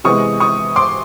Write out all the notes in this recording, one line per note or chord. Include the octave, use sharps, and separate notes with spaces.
C3 E3 G#3 B3 C#6 D#6
C#6 D#6
C6 D6